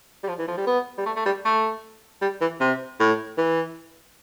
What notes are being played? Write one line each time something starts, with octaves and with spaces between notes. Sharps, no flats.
G3
F3
E3
F3
G3
B3
G3
A3
A3
G3
A3
G3
E3
C3
A2
E3